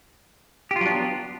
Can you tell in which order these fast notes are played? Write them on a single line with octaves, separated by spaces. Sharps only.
G4 F4 F#3 D4 B3